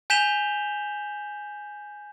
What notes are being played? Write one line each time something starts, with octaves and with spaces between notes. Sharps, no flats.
G#5 G6 B6 E7 F7 G7